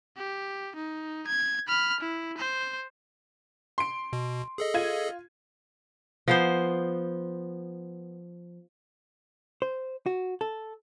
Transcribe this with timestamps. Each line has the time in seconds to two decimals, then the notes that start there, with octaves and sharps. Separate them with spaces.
0.17 G4
0.76 D#4
1.27 G#6
1.68 B5 F6
2.01 E4
2.38 C5
3.78 C6 D7
4.13 B2
4.58 G#4 A4 D#5
4.74 F4 G#6 D#7
6.28 F3 B3 C5
9.62 C5
10.06 F#4
10.41 A4